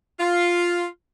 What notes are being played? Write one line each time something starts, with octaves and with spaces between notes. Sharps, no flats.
F4